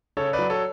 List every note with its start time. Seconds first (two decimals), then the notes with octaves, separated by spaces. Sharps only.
0.17 C#3 A4 C#5
0.33 B4 D5
0.39 F#3
0.50 A4 C#5